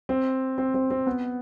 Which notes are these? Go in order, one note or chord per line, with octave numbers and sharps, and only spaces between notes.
C4
C4
C4
C4
B3